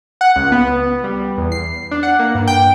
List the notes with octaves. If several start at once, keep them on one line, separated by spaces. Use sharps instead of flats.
F#5
C#2
B3
G3
E2
C7
D4
F#5
A#3
G2
G5